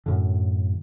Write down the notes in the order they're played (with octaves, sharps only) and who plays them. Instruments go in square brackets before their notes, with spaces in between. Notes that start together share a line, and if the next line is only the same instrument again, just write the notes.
[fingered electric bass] F#2 A2 D3